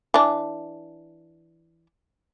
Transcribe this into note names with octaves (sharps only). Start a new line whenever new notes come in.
E3 D4